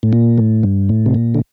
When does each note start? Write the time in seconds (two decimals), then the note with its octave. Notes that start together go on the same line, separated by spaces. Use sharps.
0.03 A2
0.13 A#2
0.38 A2
0.63 G2
0.89 A2
1.06 C3
1.14 A#2
1.35 D3